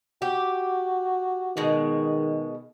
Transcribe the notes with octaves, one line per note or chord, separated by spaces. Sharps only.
F#4 G4
B2 D#3 G#3